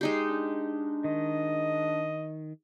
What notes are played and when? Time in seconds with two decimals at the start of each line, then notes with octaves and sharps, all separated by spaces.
0.01 G#3 D#4 G4 C7
0.29 D4
1.04 D#3 D#5